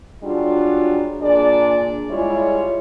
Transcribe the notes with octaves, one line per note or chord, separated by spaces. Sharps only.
F#3 G3 D4 F4 G#4
A#2 D4 G#4 D5
G3 G#3 E4 F4 C#5